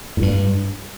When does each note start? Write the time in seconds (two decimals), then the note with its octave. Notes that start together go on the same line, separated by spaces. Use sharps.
0.17 A2
0.22 G2